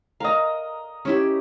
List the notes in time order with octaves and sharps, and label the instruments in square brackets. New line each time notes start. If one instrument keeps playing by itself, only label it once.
[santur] A#4 D#5 [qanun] F5 A#5
[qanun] C#4 E4 G4